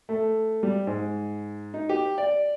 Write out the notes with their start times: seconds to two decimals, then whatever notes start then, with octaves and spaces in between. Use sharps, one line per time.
0.09 A3
0.63 G3
0.87 G#2
1.74 D#4
1.89 G4
2.18 D5